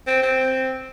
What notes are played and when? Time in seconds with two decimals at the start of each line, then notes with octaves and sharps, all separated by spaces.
0.07 C4
0.22 C4